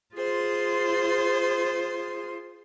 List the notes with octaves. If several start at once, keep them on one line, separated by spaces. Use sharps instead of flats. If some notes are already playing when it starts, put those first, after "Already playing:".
F4 G#4 C5 C6